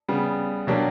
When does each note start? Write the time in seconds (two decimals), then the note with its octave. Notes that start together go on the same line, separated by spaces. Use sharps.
0.08 C#3 G3 B3
0.67 B2 F#3 A#3 D4 G4